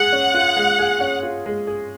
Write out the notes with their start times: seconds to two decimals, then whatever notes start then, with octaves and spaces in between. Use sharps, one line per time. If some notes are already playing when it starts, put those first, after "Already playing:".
Already playing: G#3 G#4 F#5
0.13 C#4
0.34 F4
0.56 G#3
0.79 G#4
1.01 C#4
1.23 F4
1.46 G#3
1.67 G#4